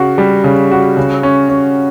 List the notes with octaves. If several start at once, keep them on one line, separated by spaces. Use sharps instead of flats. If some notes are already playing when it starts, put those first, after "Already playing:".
Already playing: C#3 F#4
G3
C#3
F#4
C#3
C#4
C#4